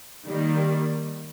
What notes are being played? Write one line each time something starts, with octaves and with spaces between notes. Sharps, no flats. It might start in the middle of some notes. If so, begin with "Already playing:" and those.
D#3 G3 A#3